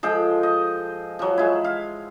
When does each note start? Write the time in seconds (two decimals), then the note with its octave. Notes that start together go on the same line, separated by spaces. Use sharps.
0.03 F3 G#3 A4 G5
0.43 D#5
1.19 F3 F#3
1.38 G#3 E4
1.64 F5